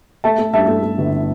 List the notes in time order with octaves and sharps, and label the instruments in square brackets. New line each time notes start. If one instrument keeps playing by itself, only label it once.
[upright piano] A3 E5 A5
A3
G2 E5 A5
A3
A3
G1